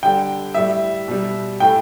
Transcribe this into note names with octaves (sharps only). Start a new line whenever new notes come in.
D3 G3 G5
A2 G3 E5
B2 G3
A2 A3 G5